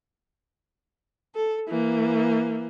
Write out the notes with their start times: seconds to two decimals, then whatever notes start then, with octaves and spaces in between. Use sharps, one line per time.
1.35 A4
1.69 E3 A#3